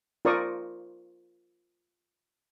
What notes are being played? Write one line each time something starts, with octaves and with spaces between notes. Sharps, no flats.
F4 A#4 C5 D5 C#6 D#6